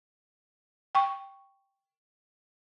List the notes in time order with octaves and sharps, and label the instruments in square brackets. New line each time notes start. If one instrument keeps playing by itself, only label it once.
[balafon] G5 C#6